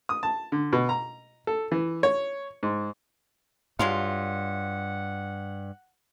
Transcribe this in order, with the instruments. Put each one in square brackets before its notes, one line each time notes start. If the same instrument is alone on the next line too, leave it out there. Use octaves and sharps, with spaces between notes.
[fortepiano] D#6
A5
D3
B2
A#5
A4
E3
C#5
G#2
[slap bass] G2 [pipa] F#3 G#3 F4 [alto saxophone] F#5